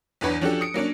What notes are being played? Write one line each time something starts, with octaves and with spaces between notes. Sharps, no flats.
B1 E2 D4 B4 C#5
F3 C#4 D4 F#4 G4 A4
D#6 C#7 D7
F#3 A#3 C#4 D4